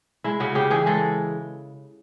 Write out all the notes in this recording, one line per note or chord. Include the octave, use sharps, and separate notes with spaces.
G#3 E4
C#3 F#4
C#3 G4
E3 G#4
G#3 A4